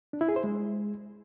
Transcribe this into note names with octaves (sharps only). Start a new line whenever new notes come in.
D4
E4
G#4
C5
G#3